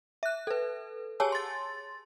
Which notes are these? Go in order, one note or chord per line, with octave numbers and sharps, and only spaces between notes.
E5 F#6
A4 B4
G4 G#4 C#5 G#5 A5 E6
C6 A6